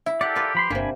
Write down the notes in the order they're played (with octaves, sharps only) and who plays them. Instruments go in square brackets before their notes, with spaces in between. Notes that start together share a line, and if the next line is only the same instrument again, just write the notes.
[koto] E4 [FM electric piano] E5
[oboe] G4 [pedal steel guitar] A4 A#4 D5 [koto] F#5
[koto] F4 B4
[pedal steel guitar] F3 B5 C6
[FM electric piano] G1 [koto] C3 A#3 [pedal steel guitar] D4 G#5 B5